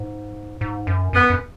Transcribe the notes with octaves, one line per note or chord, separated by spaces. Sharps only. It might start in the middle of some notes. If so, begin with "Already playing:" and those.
Already playing: G#2
G#2
F#2
F#2 B3
F#2